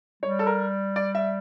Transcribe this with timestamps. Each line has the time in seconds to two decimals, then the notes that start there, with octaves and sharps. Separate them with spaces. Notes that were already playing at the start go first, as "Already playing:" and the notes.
0.23 G3 C#5
0.39 A4
0.47 A#4
0.96 D5
1.15 E5